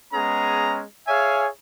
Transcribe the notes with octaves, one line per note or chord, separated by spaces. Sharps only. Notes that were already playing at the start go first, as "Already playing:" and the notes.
G#3 B3 C#4 G#4 A#5
G#4 C#5 E5 F5 G#5